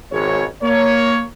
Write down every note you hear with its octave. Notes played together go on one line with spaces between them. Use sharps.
G#1 C#2 C#5
A#3 C#5